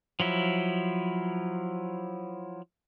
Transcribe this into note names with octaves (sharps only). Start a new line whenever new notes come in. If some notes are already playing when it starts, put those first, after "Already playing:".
F3 F#3 E4